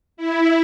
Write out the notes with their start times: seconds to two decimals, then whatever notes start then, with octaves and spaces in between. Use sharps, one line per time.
0.17 E4